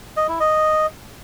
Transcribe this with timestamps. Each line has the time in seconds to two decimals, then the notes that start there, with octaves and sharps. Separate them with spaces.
0.17 D#5
0.28 E4
0.40 D#5